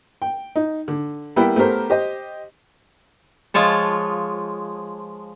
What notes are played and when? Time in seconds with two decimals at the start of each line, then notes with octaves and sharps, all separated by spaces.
0.22 G5
0.56 D#4
0.88 D3
1.36 G3 A#3 B3 E4 B4 G5
1.56 A3 B3 G4 A#4 C5
1.90 G4 C5 D#5
3.54 F3 G#3 F4 C#5 A5